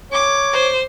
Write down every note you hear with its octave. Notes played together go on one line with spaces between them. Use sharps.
C#5 D6
C5